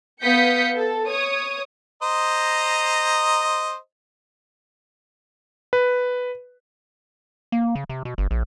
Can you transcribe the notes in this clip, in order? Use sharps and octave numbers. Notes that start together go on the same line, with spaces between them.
B3 F5 D#6 G6 B6 C#7
A4
C#5 D#6
C5 D#5 A#5
B4
A#3
C#3
C3
B2
G1
A#1